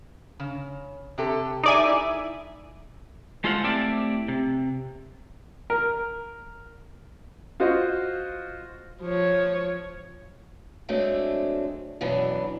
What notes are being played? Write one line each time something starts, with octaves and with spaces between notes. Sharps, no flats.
C#3
C3 G4 A4
D#4 G4 G#4 D5 E5 G#5
E4
G#3 F4 A4 C5 F5 F#5
A3 C4 E4 G4 D5 A5
C3
A#4
F4 F#4 C5 D#5
F3 C#5
F#3 G#3 A3 C4 D4
F#2 B2 E3 F#3 D4